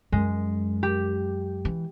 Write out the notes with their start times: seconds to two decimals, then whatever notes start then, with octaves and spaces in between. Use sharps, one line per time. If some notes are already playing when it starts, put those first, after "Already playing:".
0.12 F#2 G#3
0.83 G4
1.65 E3